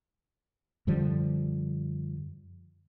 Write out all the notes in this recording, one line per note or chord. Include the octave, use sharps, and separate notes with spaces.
F#2 D3 F3 G3